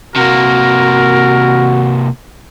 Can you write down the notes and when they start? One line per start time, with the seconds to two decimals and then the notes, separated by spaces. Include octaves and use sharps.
0.16 C3 A#3 F#4 A#4